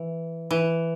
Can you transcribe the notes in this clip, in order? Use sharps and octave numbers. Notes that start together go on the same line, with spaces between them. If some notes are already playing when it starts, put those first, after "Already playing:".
Already playing: E3
E3